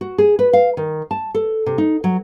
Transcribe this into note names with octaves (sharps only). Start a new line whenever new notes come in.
F#4
G#4
B4
F5
D#3
A5
A4
C3
D#4
F#3